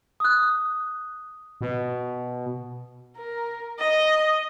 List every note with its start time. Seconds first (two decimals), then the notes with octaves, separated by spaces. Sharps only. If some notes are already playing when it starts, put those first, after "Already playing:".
0.20 D#6 F#6
1.61 B2
3.17 A#4
3.79 D#5